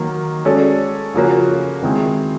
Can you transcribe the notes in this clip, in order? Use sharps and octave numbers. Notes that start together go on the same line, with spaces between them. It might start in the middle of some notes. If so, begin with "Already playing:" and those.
Already playing: D#3 F#3 A#3
G#3 C#4 F#4 A4 D5
C#3 F3 A#3 C#4 F#4
D#3 G#3 C4 E4